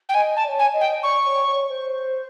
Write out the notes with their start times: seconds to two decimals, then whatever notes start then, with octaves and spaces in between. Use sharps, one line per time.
0.09 G5
0.14 D#5 G#5
0.36 A5
0.43 D5
0.48 C#5
0.59 G#5
0.73 D#5
0.80 G5
1.03 D5 C#6
1.25 C#5
1.48 C#5
1.69 C5